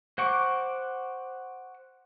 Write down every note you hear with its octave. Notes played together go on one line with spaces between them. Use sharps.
C5 F#5 C#6 D6